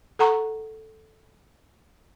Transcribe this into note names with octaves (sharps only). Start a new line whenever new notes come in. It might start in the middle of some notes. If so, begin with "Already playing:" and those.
A4 F#5 A#5 C#6